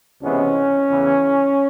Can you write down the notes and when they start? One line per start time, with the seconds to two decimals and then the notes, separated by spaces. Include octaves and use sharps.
0.22 C#2 C3 E3 G#3 B3 C#4
0.89 E2 C#3 E3